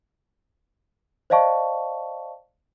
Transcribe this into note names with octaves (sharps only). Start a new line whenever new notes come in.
C5 D5 D#5 F5 A5 C#6